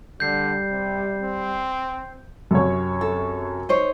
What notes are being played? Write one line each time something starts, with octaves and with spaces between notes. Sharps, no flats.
D3 G3 G6 C7
C3
C4
F#2 C3 C#5
A4
D#4 C5 C#5